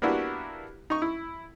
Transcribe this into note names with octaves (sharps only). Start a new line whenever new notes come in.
A#3 B3 D4 E4 F#4 G4
D#4 C#6
E4